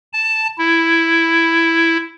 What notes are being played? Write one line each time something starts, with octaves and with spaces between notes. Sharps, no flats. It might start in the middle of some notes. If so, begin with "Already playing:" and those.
A5
E4